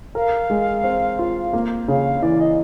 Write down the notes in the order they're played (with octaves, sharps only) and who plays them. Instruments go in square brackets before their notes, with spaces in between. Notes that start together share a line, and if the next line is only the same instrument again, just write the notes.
[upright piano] A#4 [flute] F5
[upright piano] G#3
C4
F4
A#3
[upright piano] C#3 [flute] F5
[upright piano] E3 [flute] D5
[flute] D#5